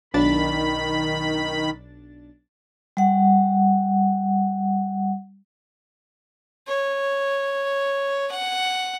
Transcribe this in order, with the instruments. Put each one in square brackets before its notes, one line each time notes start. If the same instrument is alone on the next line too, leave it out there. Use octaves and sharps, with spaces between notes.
[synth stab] B1 D4 A6 [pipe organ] D#3 B5
[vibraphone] G3 F#5
[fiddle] C#5
F#5